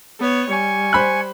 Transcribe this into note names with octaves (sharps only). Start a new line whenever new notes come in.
B3 C#5
G3 G#5 C#6
C5 B5 F#6